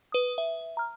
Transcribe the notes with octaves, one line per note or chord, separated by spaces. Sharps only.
B4 D#6
E5
A#5 F6